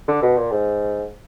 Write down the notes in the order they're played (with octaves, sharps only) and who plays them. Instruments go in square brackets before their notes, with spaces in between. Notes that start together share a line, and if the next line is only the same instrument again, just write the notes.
[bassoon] D3
B2
A#2
G#2